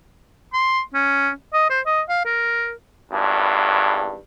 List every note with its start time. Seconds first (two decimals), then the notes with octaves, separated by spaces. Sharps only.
0.53 C6
0.94 C#4
1.54 D#5
1.70 C5
1.86 D#5
2.09 F5
2.25 A#4
3.12 G#1 E2 G2